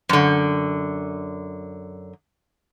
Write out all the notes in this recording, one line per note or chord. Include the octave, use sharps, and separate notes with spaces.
F#2 D3